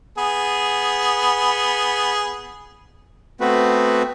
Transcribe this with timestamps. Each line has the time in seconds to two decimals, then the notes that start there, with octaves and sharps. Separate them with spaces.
0.18 B3 G#4
3.41 A3 B3 C4 F#4 B4